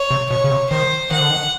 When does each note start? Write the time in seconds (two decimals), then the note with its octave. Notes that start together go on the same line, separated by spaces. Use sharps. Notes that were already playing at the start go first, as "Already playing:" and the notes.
Already playing: C#5
0.11 C3
0.30 B2 C#5
0.44 C#3
0.51 C3
0.70 D#3 C5
1.11 D#3 F#5
1.20 D3
1.30 D#3